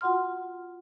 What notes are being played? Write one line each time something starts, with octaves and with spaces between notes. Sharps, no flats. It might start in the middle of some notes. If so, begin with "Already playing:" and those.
F4 F#4 F#5 C6 F6